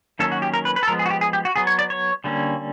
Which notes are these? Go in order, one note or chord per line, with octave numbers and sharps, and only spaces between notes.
D#3 F#3 A#3 C#4 A4
F#4
G4
A#4
B4
B4
A4
F3 G#3 B3 A#4
G#4
F#4
G4
G#4
G4
F#4
F#3 B3 G#4
C#5
D5
C#5
D3 G3 A#3 C#4